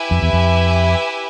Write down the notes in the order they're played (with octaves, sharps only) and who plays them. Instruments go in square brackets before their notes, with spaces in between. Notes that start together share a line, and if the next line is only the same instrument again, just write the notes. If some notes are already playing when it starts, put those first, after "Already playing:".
Already playing: [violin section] E4 G4 B4 E5 G#5
[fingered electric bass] F2
E2
F2